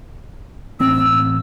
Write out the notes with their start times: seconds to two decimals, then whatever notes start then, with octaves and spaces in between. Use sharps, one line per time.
0.80 A1 C4 E6